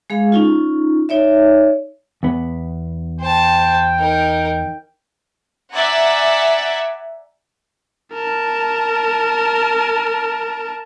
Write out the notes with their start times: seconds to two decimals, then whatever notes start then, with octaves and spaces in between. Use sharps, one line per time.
0.10 G#3 G#4 F5
0.32 C#4 D#4 F4
1.09 D#4 C#5 D5 E5
2.23 E2 B3
3.21 C5 G5 A5
3.99 D#4 A#4
5.73 D5 E5 F#5 G#5 A#5
8.14 A#4 A5